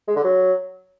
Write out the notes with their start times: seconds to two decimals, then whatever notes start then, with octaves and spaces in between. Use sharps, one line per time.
0.08 G#3
0.16 D3
0.24 F#3